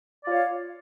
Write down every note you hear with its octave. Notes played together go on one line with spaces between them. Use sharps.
F4 C#5 D5 F5